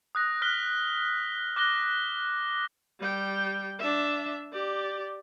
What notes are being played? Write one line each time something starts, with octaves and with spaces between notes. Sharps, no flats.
D#6 F#6 A#6
F6 F#6 B6 G7
D6 F#6 A#6 G7
G3 G5
D4 E5
G4 D5